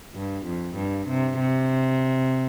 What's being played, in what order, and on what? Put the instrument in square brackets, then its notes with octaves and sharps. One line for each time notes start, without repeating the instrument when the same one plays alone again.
[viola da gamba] G2
F2
G2
C3
C3